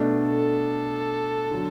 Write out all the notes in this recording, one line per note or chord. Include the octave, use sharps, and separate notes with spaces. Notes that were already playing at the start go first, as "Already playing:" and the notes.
Already playing: B2 A3 D4
A4
D3 F#3